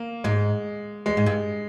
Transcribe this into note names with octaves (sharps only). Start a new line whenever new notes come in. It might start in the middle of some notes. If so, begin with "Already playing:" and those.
Already playing: A#3
G#2 G#3
E2 G#3
G#2
G2